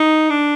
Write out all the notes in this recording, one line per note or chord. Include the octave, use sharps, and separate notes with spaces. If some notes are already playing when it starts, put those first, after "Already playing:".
Already playing: D#4
D4